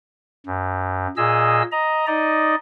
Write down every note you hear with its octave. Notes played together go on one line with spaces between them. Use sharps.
F#2
A#2 G#4 D#5 E6
D#5 A#5
D#4 D5 D#5